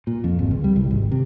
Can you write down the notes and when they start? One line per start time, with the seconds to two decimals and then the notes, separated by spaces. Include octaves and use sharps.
0.07 A#2
0.24 F2
0.39 G#1
0.51 C#2
0.64 G3
0.76 C2
0.91 G#1
1.12 C3